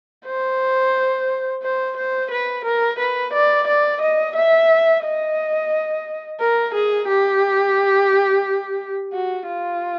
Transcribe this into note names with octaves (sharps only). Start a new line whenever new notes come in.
C5
C5
C5
B4
A#4
B4
D5
D5
D#5
E5
D#5
A#4
G#4
G4
F#4
F4